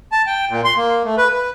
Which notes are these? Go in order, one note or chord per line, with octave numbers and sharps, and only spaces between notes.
A5
G5
A#2
C6
A#3
A3
B4
B4